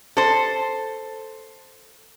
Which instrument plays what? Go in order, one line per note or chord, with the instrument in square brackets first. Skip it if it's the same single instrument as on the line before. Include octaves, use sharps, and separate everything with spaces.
[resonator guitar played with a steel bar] A4 C5